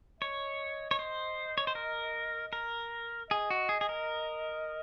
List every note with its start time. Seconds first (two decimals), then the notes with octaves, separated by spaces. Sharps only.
0.21 C#5 D#5
0.91 C#5
0.99 C5
1.58 C#5
1.67 C5
1.75 A#4
2.53 A#4
3.30 G#4 D#5
3.50 F#4
3.69 G#4
3.81 G#4
3.89 A#4